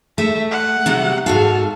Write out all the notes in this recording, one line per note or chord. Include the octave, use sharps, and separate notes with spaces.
A3 E5
F#5
C3 F#3 G3
G#2 F#4 A4 F5